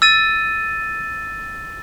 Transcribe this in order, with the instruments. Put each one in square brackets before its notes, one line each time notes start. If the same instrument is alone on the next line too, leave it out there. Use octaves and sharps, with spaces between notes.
[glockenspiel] E6 A6 D#7